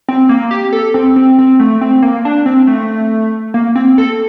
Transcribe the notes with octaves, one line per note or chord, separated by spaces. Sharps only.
C4
A#3
G4
A4
C4
C4
C4
A3
C4
A#3
D4
C4
A3
A#3
C4
A4